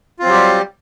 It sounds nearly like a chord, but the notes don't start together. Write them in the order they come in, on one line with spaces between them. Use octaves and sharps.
F4 C4 F#3 G4 G3